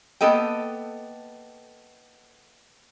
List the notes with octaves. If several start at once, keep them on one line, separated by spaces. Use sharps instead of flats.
A#3 B3 A4 D#5 G5